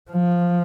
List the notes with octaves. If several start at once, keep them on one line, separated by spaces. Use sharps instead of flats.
F3